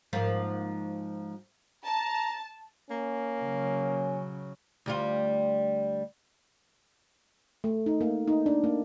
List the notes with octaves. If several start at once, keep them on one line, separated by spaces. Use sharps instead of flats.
G#2 F3 A#3
A5 A#5
A#3 C#4
C#3 F#3
D2 G3 F4
A3
D#4
A#3
D#4
D4
A#3